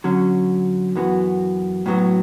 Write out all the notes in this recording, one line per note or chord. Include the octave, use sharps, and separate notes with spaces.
D3 F#3 C#4
F#2 E3 B3 F#4
A2 F#3 B3 F#4